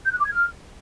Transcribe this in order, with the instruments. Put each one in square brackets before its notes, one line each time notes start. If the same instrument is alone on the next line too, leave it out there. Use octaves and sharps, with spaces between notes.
[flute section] G6
F#6
D6
G#6
F6